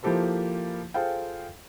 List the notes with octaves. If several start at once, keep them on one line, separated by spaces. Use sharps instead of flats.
F3 A#3 E4 G4 A4 C5
F4 G#4 A4 C5 F5 G5